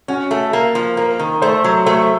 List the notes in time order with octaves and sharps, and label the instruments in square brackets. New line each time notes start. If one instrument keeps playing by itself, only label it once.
[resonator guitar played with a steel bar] C#4 [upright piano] F#4
[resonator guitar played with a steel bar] A3
A#3
F3
[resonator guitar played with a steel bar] A#3 [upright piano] A#4
[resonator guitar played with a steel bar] D#3
[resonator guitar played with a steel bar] A3 [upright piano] C5
[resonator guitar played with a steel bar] F#3
[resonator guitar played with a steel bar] A3 [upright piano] C5